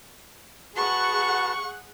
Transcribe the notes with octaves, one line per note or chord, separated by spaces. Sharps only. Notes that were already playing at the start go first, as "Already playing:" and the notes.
F#4 G#4 B4 F#5 A5 C#6